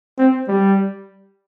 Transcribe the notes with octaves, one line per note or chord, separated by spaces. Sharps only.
C4
G3